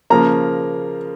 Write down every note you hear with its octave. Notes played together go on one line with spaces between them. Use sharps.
C#3 F3 A#3 A#5